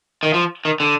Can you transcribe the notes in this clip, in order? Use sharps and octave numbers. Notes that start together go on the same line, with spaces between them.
D#3
F3
D#3
D3